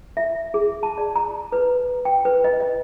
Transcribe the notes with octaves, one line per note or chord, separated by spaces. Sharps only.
E5
G#4
A5
D5
A#5
B4
G5
B4
D#5
D#5